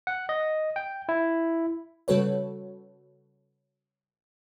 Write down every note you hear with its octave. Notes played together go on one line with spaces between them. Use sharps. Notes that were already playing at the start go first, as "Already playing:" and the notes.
F#5
D#5
G5
E4
C#3 G3 F#4 A4 B4 C#5